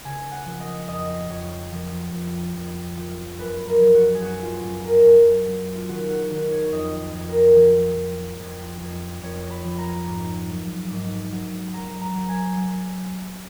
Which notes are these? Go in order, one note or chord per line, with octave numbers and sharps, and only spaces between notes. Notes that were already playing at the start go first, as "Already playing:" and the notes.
C#3 G#5
F#5
F3
D#5
F2 D#5
F2 C#5
F3
F2
F2
F3
F#2 B4
A#4
F#3
F#4
G#4
F#2 F#4
F4
F#2
A#4
F#2
F#3
F4
D#3 F#4
F#4
D#3 F#4
C#5
F2 D#5
F2
A#4
F3
F3
F2
F2
F2 C#5
B5
F3
A#5
G#2
F#3
G#2
F#3
F#3 A#5
A#5
F#3
G#5
F#3